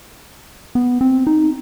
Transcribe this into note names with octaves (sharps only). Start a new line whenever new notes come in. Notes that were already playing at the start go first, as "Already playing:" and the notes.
B3
C4
D#4